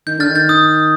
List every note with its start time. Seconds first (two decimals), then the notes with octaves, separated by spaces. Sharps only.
0.07 D#3 G6
0.18 D3 F6 A6
0.29 D#3
0.35 G6
0.49 D#6